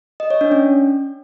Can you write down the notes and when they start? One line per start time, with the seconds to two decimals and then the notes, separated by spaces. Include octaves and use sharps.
0.20 D#5
0.30 C#5
0.41 D4
0.51 C#4